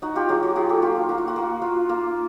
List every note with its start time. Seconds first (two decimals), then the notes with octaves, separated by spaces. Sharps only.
0.02 D#4 F#4
0.15 F4 G4
0.29 F#3 F#4 G#4
0.43 F#4
0.55 F4 F#4 G#4
0.69 G4 A4
0.82 A#3 F4 G4
0.96 F4
1.09 A#3 F#4
1.18 F4
1.28 F#4
1.36 A#3
1.62 F4
1.89 A#3